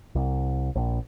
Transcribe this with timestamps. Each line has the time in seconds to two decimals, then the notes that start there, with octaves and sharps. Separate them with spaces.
0.15 C2
0.75 A#1